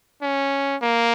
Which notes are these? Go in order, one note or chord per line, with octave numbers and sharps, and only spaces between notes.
C#4
A#3